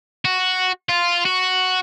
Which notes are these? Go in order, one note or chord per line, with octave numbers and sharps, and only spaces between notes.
F#4
F4
F#4